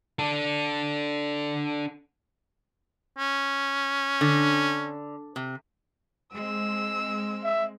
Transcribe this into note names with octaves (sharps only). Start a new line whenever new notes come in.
D4 A4
C#4
D3
C3
G#3 C4 E6
E5